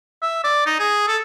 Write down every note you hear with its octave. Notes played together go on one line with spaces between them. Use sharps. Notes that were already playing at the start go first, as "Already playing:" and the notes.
E5
D5
D#4
G#4
A4